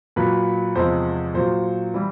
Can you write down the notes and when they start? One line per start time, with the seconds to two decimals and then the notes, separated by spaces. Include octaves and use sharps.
0.16 A#2 F#3 B4
0.75 E2 C3 F3 G#3 C5
1.34 A#2 F#3 C5
1.94 E3 G3